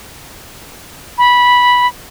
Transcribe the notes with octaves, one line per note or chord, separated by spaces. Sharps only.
B5